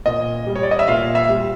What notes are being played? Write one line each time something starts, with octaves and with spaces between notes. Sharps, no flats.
A#2 D#5
G3
C#5
D5
D#5
E5
A#2 F5
E5
G3